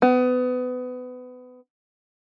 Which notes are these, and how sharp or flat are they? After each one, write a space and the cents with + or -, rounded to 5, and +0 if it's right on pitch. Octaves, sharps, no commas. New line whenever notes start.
B3 +25